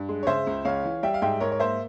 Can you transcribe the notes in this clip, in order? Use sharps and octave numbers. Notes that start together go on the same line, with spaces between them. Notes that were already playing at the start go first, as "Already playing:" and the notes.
Already playing: G2
G#3
C#5
C#3 C5 E5
C#2
C#2 C#5 F5
E3
G3 E5 G5
F5
G#2 E5 G5
G#2 A#4 C#5
C#5
A#3 C5 E5